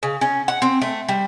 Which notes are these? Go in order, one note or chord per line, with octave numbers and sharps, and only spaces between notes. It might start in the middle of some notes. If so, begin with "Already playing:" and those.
C#3
C#4
F#5
C4
A3
G3